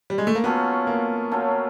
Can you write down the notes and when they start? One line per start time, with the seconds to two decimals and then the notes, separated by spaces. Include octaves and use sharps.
0.10 G3
0.18 G#3
0.27 A3
0.35 A#3
0.44 F#3 A3 B3 C#4 F4
0.87 A#3
1.32 F#3 A3 C#4 F4